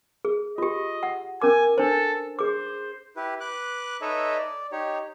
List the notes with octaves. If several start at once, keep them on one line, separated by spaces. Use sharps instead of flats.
G#4
F4 G4 D#5
F#5
C#4 A#4 G#5 D6
D4 A4 C5
G#4 C5 D6
E4 G4 B4
B4 D6 F#6
D#4 A4 B4 C#5 D#5 E5
D5
D#4 G4 C#5